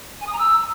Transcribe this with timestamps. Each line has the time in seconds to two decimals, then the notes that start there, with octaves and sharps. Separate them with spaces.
0.21 G#5
0.27 D#6
0.33 A#5
0.39 E6